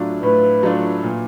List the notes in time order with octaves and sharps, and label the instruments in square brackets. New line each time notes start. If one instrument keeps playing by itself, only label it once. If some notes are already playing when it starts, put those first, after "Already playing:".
Already playing: [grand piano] A2 F#3 A3 D4 F4
[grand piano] A2 [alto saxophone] B4
[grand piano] F#3 A3 D4 F4
A#2